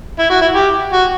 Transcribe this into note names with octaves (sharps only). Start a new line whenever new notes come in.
E4
F#4
E4
G4
F#4